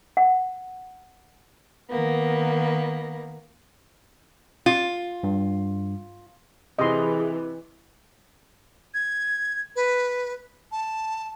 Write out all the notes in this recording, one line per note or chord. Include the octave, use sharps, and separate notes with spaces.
F#5
D#3 A#3 B3
F4
G2
C3 E3 G#4 D#5 C6
G#6
B4
A5